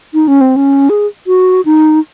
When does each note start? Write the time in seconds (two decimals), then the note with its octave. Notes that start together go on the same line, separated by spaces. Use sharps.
0.14 D#4
0.28 C#4
0.41 C4
0.56 C#4
0.90 G#4
1.27 F#4
1.65 D#4